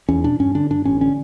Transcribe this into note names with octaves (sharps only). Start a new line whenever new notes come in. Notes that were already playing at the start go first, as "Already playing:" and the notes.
E2 C#4
B2 D4
G2 C#4
D3 D4
G2 D4
A1 C#4
D3 C#4